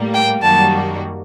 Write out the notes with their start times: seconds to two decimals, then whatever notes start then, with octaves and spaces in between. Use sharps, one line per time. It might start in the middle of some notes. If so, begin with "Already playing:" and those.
Already playing: A2 G3 A#3
0.14 G5
0.42 F#2 D#3 G3 A#3 F#4 A5